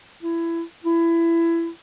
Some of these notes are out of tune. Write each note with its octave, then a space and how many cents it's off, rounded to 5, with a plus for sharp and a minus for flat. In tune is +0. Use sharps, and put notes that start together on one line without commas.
E4 +20
E4 +20